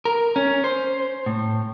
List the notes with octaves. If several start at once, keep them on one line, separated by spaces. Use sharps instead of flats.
A#4
C#4
C5
A2